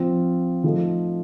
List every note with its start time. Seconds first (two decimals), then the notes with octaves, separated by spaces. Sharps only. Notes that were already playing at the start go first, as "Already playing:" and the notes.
Already playing: F3 C4 F4
0.64 F3 A3 D#4 A4